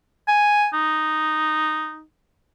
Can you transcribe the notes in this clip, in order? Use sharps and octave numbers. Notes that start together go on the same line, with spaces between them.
G#5
D#4